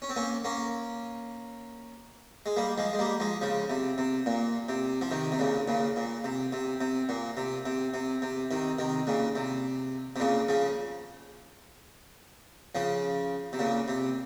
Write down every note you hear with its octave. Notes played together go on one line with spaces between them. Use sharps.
C#4
C4
A#3 C#4
A#3 C#4
G#3
G3 A#3
F3 G#3
G#3
G3 A#3
F3 G#3
C#3 F3
C3
C3
A#2
C3
F3
C3 D#3
C3
A#2 C#3
A#2 C#3
A#2
C3
C3
C3
A#2
C3
C3
C3
C3
C3 D#3
C3 D#3
A#2 C#3
C3
C3
A#2 C#3
C#3 F3
C#3 F3
C3
A#2 C#3
C3